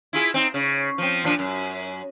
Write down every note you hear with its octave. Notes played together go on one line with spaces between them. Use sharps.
E4 F4 G#4
C4 D#4
C#3
F3 C4
A#2 F3 D4
F#2